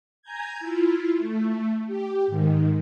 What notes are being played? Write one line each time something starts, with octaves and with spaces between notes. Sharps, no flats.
G#5 A#5 G6 G#6
E4 F4
A3
G4
G#2 D#3